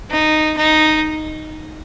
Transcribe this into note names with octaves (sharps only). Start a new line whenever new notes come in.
D#4
D#4